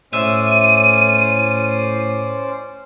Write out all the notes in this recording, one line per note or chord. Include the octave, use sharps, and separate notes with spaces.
A2 C#4 C5 D5 E5 D#7